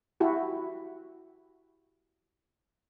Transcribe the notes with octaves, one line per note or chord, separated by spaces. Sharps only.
E4 F#4 G4